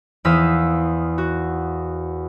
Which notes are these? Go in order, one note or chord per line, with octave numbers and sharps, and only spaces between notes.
E2 C5 F5 D#6 E6 B6
F#4